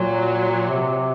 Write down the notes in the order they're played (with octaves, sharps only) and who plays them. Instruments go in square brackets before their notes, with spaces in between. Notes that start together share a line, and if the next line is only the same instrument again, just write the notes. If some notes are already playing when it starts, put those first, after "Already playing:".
Already playing: [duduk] A#2 [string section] F#3
[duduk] C3